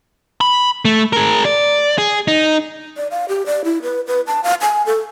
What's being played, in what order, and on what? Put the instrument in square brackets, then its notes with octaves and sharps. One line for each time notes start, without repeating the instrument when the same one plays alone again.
[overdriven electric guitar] B5
A3
G#4 A#4
D5
G#4
D#4
[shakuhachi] D5
F5
G4
D5
E4
B4
B4
A5
F5
G#5
A4